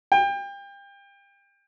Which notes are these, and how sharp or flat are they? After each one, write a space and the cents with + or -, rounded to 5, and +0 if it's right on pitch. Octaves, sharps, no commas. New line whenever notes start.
G5 +30